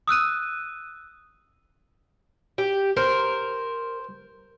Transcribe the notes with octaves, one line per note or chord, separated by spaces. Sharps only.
D#6 E6 F#6 D#7
G4
A#4 C5